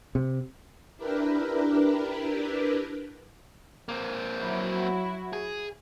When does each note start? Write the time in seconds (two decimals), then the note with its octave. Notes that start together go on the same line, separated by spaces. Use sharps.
0.15 C3
0.97 D4 E4 G4 A#4 B4
3.89 A#3 C4
4.40 F#3 E4 F#4
5.33 G#4